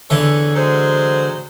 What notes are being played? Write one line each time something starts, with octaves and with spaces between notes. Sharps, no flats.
E2 D3 E3 C#5
F#3 G#3 C5